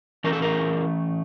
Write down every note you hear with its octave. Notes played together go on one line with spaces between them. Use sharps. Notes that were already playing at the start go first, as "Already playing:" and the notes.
E3 A3 C#4 A#4
A4
G#4 A#4